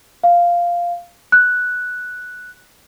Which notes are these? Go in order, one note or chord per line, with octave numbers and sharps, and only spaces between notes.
F5
F#6